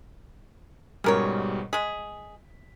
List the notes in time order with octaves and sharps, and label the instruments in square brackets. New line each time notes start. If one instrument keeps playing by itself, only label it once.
[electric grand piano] G#2 B2 G3 [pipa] C#4 A#4 C#5
[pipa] G#3 G#4 [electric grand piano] B6